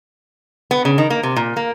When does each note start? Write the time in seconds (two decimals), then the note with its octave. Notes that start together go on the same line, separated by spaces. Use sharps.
0.71 B3
0.85 C#3
0.98 D#3
1.10 A#3
1.23 C3
1.36 A#2
1.57 A#3